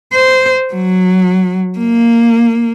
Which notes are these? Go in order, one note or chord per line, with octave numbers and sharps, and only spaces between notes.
C5
F#3
A#3